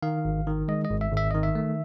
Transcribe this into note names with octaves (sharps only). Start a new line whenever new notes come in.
D#3 F5
G#1
D#3
G#3 D#5
D#5
G#1
E5
G#1 E5
D#3 D#5
E5
A3